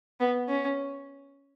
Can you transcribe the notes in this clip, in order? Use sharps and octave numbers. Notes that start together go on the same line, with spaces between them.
B3
C#4